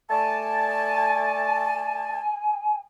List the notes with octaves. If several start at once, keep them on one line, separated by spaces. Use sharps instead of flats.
A3 D5 G#5 A5